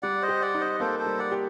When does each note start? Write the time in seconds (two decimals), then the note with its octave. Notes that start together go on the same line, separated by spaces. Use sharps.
0.03 G3 D5 F#5
0.22 C5 D#5
0.28 G4
0.42 D5 F#5
0.55 D#4
0.61 C5 D#5
0.80 A#3 A4 C5
0.99 A4 C5
1.06 G3
1.19 D5 F#5
1.32 G4